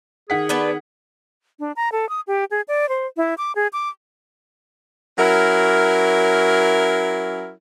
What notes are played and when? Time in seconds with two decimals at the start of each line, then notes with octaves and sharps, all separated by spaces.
0.30 D#3 G#4 F#5 B6
0.49 B3 D4 B4
1.60 D4
1.76 A#5
1.92 A4
2.09 D#6
2.27 G4
2.51 G#4
2.68 D5
2.89 C5
3.17 E4
3.38 D6
3.55 G#4
3.73 D6
5.19 F#3 C#4 E4 A#4